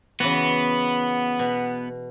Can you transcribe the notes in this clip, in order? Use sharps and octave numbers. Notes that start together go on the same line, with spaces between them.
C#3 E3 B3 F#4
B2